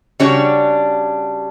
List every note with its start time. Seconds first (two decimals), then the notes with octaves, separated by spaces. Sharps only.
0.20 C#3 G3 D4 F#4 C#5